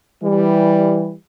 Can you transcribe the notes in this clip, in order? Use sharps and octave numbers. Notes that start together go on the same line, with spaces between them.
E3 G3